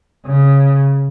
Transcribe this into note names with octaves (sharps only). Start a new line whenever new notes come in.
C#3